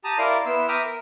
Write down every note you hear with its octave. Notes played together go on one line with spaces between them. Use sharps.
G4 A5 A#5 D#6
E4 A#4 D5 F5 C6 F6
B3 E4 C6 E6
E5 G5 A#5 D6 D#6 F6
A#4